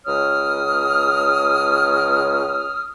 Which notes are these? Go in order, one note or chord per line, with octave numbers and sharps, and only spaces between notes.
C#2 C#5 D#6 F6